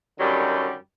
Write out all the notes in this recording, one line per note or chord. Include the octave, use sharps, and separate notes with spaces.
F#2 D3 D#3 F#3 G3